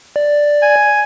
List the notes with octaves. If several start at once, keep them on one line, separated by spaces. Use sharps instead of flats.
D5
G#5